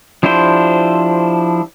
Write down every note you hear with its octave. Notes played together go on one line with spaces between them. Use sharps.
F3 D4 E4 G4 C5